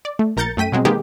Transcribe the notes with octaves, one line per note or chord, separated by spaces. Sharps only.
D5
A3
A#1 A#4 A#5 G6 A6 C#7
F#2 A3 G5 B6 D#7
B2 F#3 G#3 C4
D#3 G#3 A#3 B3 G4 G#4